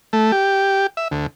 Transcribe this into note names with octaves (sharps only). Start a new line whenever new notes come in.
A3
G4
E5
D2